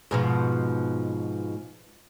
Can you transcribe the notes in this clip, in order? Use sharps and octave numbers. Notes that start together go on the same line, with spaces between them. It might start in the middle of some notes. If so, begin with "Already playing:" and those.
G#2 B2 F3